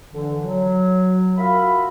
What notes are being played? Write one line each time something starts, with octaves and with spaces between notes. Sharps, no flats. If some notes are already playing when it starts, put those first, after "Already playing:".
D3 E3
F#3
F4 F#4 A#4 E5 B5